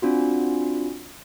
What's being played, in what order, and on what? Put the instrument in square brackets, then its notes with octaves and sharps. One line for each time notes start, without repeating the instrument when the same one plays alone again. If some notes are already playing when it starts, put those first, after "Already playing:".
[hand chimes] C4 D4 F4 F#4